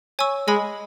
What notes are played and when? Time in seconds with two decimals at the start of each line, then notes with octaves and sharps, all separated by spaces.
0.19 C#5 G#5 C#6 E6
0.47 G#3 D#5 G#5 B5 D#6